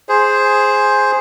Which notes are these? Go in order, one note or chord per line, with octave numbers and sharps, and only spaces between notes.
G#4 C5